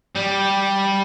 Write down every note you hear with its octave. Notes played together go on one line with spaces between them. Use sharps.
G3